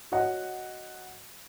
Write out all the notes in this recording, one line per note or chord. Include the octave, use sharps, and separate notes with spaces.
F#4 C#5 D#5 F#5